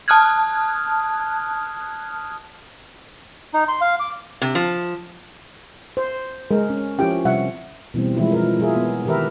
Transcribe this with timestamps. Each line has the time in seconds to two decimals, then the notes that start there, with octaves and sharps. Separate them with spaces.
0.08 A5 D#6 F6 F#6 G#6
3.54 D#4
3.68 C6
3.81 F5
4.00 D6
4.42 C3
4.55 F3
5.97 C5
6.51 G#3 A#4
6.70 C#4
6.99 F3 C#4 E4 G4 G5
7.25 C3 G3 E5 F#5
7.94 B2 E3 G3 C4
8.17 E3 F3 G#3 A3 E4
8.32 F3 E4 A#4
8.59 F#3 E4 F4 G#4 A#4 E5
8.76 B3
9.05 D#3 E3 G4 A#4 B4 E5